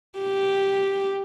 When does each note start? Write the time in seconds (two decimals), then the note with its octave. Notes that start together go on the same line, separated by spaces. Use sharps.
0.19 G4